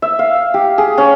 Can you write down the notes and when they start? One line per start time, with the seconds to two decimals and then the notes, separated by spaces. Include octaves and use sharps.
0.02 E5
0.19 F5
0.54 G4
0.78 G#4
0.98 C#4